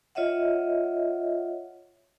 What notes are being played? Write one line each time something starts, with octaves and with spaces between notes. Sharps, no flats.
F4 C#5 D#5 E5 F#5